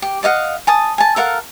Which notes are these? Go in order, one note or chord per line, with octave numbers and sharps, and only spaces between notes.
G4
D5 D#5 F5 F#5
G#5 A5 D#6
G#5 A5
A4 A#4 F5 F#5